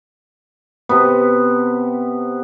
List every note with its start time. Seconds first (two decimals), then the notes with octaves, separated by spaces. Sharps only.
0.89 C3 B3